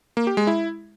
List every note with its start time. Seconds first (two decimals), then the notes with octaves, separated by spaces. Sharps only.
0.17 A#3
0.27 G4
0.37 G#3
0.47 E4